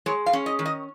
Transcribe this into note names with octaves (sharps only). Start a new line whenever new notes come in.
G#3 C#5
F5
C#4
D#5
D#3
D#5